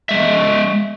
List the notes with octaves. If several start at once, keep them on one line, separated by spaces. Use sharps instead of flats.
G#3 E5